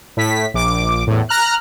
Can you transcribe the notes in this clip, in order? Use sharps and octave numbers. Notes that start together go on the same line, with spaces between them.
A2 B6
A#1 D6
E2 A2
A#5 F6 F#6